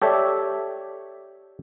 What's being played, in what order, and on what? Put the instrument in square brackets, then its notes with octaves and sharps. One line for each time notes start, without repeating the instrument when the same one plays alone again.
[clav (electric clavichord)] G4 A4 C#5 D5 E5